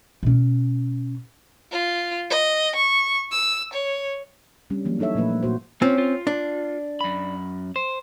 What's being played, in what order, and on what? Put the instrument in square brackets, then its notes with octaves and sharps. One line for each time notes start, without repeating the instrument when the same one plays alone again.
[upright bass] B2 C#4
[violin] F4
D#5
C#6
E6
C#5
[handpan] G3 C#4 D4
E3 F#3 A#3
D4 D#4 A4 C#5 E5
A#2 F3 A3 A#3 B4
A#3
A#2 A#3 F#4 C5
[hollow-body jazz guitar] C4 C#4 [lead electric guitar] F4
[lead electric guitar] F4
[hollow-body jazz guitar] D4
[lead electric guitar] F#2 B5
C5